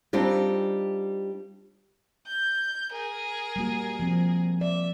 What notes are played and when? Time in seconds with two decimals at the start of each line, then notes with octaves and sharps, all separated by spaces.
0.13 G3 C4 D4 D#4 F4
2.27 G6
2.92 G#4 A#4
3.56 G3 A#3 F#4
4.00 F3 C4
4.61 D5 E5